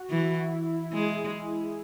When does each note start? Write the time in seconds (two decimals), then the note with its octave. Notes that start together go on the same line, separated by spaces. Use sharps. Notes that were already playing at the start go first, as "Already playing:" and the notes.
Already playing: F#4
0.10 E3 E4
0.30 E4
0.52 E4
0.73 E4
0.93 G#3 G#4